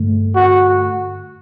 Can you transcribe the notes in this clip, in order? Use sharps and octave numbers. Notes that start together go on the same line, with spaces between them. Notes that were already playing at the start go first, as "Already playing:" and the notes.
Already playing: G2 D3 A3
F#4